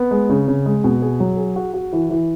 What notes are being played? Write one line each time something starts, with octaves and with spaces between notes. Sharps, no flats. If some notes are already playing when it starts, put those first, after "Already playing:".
Already playing: B3
G#3
C#3
C#3
G#3
B2
G#4
F#3
G#4
F#4
F#4
E3
E3